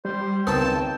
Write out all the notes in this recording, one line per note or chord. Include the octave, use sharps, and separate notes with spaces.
G3 C5
C#2 D#3 B3 C4 G5 A5